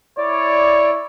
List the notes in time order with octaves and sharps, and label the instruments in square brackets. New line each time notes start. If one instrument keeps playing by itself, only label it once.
[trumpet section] E4 C#5 [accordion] D5